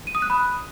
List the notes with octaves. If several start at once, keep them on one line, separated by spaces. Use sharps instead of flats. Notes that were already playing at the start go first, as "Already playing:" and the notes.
D#7
D#6
F#6
B5